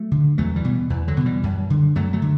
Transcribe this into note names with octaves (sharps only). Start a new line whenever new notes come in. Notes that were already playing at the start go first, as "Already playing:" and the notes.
Already playing: F#3 A3
D3
E2 F#3 A3
E3 G3
B2
E2 E3
D3 F#3
B2
E3 G3
F#2
D3
F#2 F#3 A3
F#3 A3
D3